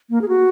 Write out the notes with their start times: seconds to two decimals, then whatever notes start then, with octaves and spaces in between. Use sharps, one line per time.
0.10 A#3
0.22 G#4
0.28 F#4